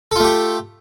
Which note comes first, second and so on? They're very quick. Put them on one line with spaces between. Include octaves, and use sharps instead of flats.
A4 F4 A3 G4